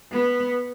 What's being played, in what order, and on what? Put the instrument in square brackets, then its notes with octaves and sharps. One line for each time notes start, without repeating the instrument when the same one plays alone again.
[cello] B3